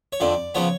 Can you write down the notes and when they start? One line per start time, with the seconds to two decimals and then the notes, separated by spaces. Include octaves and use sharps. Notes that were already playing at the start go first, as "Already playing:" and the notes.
0.12 C#5
0.20 F2 D3 F3 D5
0.55 C#3 F3 B3 C#5